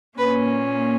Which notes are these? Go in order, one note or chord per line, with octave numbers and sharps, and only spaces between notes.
A#2 A#3 C#4 B4